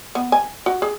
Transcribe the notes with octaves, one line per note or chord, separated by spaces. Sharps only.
B3
G#5
F#4
G#4